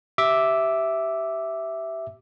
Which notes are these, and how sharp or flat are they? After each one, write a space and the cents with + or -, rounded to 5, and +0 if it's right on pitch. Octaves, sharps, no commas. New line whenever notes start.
G4 -20 E5 +0 D6 +0